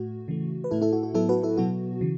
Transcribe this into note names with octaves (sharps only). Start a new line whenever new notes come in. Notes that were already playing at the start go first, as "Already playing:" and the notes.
Already playing: A2 A3 F#4
C#3 E3 A3
B4
A2 A3 E4 A4
E4 A4
F#4
F#4
A2 F#3 B3 E4 A4
F#4 B4
E4 A4
B2 F#3 B3 F#4
C#3 E3